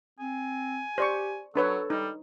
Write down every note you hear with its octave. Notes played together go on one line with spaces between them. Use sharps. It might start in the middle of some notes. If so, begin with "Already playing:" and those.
C4 G#5
G4 C5 D5 C#6
F#3 D4 A4 B4 C#5
G3 D#4